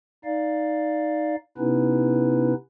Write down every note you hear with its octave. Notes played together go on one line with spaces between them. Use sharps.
D#4 D5 F5
C3 B3 C#4 D#4 E4 B4